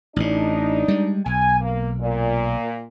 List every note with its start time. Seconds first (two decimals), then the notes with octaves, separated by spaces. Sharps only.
0.16 A1 A2 D4 D#4
0.88 G3 G#3
1.26 B1 G#5
1.61 A#3
2.00 A#2